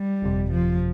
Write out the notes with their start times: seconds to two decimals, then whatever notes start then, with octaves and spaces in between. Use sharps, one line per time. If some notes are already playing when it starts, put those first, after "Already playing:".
Already playing: G3
0.22 G1 F2 C3
0.52 F3